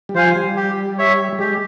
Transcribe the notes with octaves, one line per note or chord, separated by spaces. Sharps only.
G3
F3 C5 F5 G#5
G3
G4
C#5 E5
G3
G#3 G4